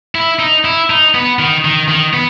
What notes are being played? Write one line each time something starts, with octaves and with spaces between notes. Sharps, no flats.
E4
D#4
E4
D#4
B3
D#3
D#3
D#3
B3